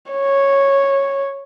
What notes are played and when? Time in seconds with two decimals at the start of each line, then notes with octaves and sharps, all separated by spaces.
0.12 C#5